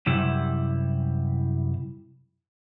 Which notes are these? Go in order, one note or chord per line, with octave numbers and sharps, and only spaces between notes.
F#2 C3 G3 E4